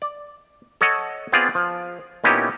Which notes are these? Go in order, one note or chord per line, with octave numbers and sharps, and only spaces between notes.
D5
A4 C#5 D#5 F#5
B3 C4 F4 G#4 D5 F5
F3
A#2 B3 C#4 D#4 E4 G4